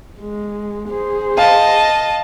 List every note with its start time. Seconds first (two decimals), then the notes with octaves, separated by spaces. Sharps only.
0.20 G#3
0.88 G#4 C5
1.38 D#5 F5 A5